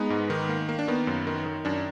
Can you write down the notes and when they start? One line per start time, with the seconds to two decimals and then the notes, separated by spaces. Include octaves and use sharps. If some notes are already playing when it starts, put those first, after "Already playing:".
Already playing: G#3 B3 D#4
0.10 G#2
0.30 D#3
0.49 A#3
0.69 A#3
0.79 D4
0.88 D#3 B3
1.07 F#2
1.27 D#3
1.46 D#3
1.65 F#2 D4